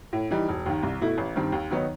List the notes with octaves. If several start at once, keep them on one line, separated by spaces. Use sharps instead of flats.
A2
E3 G3 D#4
E1
D#2 D#3
C2
B2 A3 E4
A1
G2 D#3 G3 C4
D#2
D#3 F#3 B3 D#4